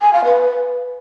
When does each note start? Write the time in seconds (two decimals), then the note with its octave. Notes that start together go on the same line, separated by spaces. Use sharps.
0.02 G#5
0.13 F5
0.25 B4